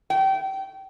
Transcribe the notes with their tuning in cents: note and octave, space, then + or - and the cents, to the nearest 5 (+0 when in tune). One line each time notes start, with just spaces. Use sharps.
G5 -25